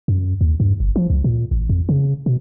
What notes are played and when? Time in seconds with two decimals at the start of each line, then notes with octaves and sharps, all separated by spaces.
0.08 F#2
0.41 D#2
0.60 G2
0.80 G1
0.96 F3
1.10 C#2
1.24 A#2
1.51 A1
1.69 F2
1.89 C#3
2.26 B2